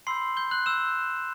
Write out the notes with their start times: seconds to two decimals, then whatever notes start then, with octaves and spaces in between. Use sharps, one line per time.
0.07 B5 C6 E6 G6 C7
0.37 G6 G7
0.51 F#6 F#7
0.66 B5 E6 G6 E7